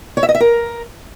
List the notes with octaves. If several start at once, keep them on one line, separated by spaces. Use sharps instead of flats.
C#5
E5
D#5
E5
A#4